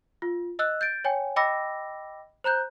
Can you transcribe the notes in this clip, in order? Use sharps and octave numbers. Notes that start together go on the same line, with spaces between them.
F4
D#5 E6 F#6
G6 A6 D7
C#5 G5 G#5
D#5 G5 B5 D6 E6 A#6
C5 A#5 F#6 G6